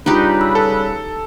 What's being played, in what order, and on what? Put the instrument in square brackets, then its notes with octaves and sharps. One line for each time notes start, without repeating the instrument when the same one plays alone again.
[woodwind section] C#3 G3 B4 [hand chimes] D4 F4 [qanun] D#4 G4
[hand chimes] E6
[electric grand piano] A4